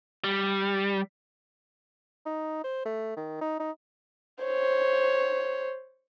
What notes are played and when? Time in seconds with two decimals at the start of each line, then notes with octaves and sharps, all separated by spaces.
0.24 G3
2.26 D#4
2.64 C5
2.85 A3
3.16 D#3
3.41 D#4
3.60 D#4
4.43 C5 C#5